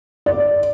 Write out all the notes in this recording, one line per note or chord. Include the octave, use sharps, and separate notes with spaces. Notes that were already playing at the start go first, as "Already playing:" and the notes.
D5